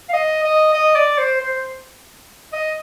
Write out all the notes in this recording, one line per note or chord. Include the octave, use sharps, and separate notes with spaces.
F5
D#5
D#5
D#5
D5
C5
C5
D#5